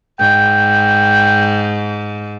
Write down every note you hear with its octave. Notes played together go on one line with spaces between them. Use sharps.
G#2 G5